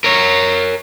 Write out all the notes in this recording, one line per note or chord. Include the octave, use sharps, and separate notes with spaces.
A#4 C#5